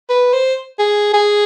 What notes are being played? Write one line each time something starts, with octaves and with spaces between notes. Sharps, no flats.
B4
C5
G#4
G#4